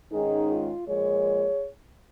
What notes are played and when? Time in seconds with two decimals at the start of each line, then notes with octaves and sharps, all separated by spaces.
0.11 G#2 D#3 G#3 C#4 D#4 G#4
0.50 F4
0.87 A#2 F3 G#3 G#4 C#5